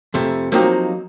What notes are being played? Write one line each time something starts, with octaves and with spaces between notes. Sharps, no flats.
F2 C3 A3
F3 F#3 A#3 C4 D#4 G4